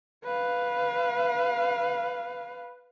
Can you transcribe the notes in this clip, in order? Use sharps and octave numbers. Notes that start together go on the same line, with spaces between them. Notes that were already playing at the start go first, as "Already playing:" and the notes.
B4 F5